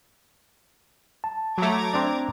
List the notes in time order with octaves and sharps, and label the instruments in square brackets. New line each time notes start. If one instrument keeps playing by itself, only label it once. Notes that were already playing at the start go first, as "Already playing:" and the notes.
[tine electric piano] A5
[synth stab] F#3 A3 [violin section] A#5 D6 G#6
[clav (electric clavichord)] C4 D4 D5